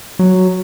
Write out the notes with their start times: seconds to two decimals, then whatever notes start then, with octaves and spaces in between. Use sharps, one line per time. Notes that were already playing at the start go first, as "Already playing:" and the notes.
0.19 F#3